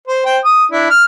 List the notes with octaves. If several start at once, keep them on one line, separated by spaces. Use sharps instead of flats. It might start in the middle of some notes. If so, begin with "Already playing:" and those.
C5
C5 G5
D#6
D4 E4
F6